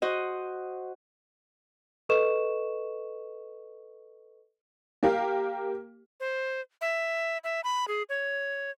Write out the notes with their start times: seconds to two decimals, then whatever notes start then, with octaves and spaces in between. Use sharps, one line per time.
0.02 F#4 C5 D#5
2.09 A4 B4 D#5 C#6 E7
5.03 A#3 G4 A#4 F5
6.20 C5
6.81 E5
7.44 E5
7.64 B5
7.88 G#4
8.09 C#5